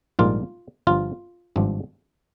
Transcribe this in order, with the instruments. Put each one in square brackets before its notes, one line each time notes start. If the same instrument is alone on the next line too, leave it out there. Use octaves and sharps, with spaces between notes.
[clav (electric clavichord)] A#1 G#2 G3 A#3 F4
G1 G2 F3 F4
G#1 G2 F3